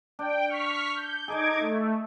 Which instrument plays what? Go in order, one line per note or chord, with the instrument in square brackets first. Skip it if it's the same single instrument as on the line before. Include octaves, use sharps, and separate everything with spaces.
[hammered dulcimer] D4 [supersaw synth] G5
[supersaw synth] C#6 F6 B6
G6
[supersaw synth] D#4 D6 G#6 [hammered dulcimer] G#4 A4 D#5
[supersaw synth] A3 [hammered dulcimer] E5